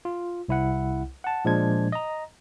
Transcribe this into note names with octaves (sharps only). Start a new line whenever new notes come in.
F4
C2 E4 F#5
F#5 A5
A#2 F3 G#3 D4 G#6
D#5 A#5